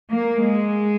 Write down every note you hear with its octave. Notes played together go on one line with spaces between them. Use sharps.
A#3
G#3